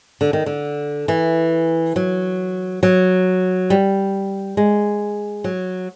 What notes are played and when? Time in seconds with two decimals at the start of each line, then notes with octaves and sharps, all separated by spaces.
0.21 D3
0.33 D#3
0.46 D3
1.08 E3
1.96 F#3
2.83 F#3
3.70 G3
4.57 G#3
5.44 F#3